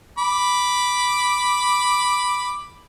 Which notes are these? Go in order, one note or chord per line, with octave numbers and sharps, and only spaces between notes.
B5 D6